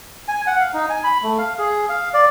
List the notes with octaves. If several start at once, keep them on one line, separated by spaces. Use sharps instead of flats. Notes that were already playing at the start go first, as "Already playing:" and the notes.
G#5
F#5
F5
D#4
G#5
B5
A3
F5
G#4
F5
D5